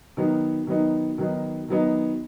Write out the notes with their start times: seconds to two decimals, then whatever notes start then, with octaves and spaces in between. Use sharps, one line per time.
0.17 D#3 F#3 B3 D#4
0.67 D#3 F#3 B3 D#4
1.18 D#3 F#3 B3 D#4
1.69 D#3 F#3 B3 D#4